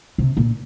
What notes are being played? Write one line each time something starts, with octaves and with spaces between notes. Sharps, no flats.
C3
A#2